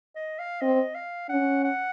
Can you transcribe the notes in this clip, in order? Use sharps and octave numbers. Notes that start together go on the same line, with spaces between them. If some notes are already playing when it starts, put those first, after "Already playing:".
D#5
F5
C4 D#5
F5
C#4 F#5
F#5